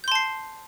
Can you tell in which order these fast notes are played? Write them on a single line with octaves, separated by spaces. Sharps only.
G6 C6 A5 C7